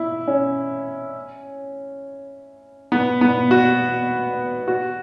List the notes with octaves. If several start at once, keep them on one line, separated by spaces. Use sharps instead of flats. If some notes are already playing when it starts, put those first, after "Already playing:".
Already playing: E4
C#4
B3
B3
F#4
F#4